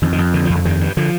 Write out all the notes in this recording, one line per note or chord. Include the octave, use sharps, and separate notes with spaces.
F2 D#3
D#3
F2
D3 D#3
F3
F2
D3
G2 D#3
G2
D3 F3